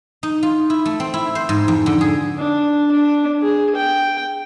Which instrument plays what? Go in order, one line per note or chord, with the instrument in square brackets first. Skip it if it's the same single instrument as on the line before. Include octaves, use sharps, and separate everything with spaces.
[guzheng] D#4
F4
E4
A3
C4
E4
C5
G#2
F2
D3
G#4
[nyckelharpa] D4
D4
G#4
G5